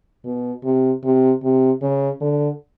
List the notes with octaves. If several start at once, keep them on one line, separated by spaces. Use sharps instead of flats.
B2
C3
C3
C3
C#3
D3